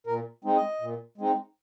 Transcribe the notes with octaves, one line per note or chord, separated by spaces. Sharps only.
A#2 A#4
G#3 C4 D#4
D#5
A#2
G#3 C4 D#4